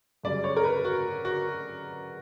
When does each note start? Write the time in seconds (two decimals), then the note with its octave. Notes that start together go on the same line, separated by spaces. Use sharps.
0.23 F#2 C#3 G3 D5
0.44 C#5
0.57 A#4
0.64 B4
0.85 F#4
1.25 F#4